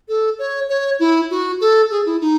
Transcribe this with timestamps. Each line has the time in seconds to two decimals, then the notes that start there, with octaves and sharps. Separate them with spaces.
0.09 A4
0.39 C#5
0.69 C#5
0.99 E4
1.30 F#4
1.61 A4
1.91 G#4
2.06 E4
2.21 D#4